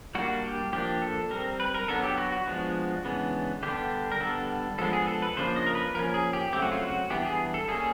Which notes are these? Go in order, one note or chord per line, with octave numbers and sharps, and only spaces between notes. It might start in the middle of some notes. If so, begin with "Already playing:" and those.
G3 A#3 D4 F#4
G4
F3 A#3 D4 G4
A4
G3 C4 A#4
B4
A#4
F#3 B3 D4 A4
G4
F#4
F#4
F3 G#3 B3 D4
C#3 E3 G#3 B3 D4
D3 G3 B3 D4 G4
A#4
D3 G3 B3 D4 A4
F3 G#3 B3 D4 A4
G#4
A4
B4
C#3 F3 A#3 D4 C5
D#5
A#4
B4
F3 A#3 C#4 A#4
G#4
G4
C#3 F#3 A3 C4 G4
F#4
F4
F#4
E3 G3 B3 D4 G4
G#4
A4
G3 A#3 C#4 G#4